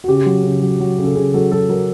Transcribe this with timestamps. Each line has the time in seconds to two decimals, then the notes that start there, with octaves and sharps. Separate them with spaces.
0.04 F#4
0.08 C#3 G4
0.26 F#3
0.43 C#3
0.62 F#3
0.80 F#3
0.98 C#3
1.04 A4
1.15 C#3 G#4
1.34 F#3 A4
1.51 F#3 A4
1.69 F#3 A#4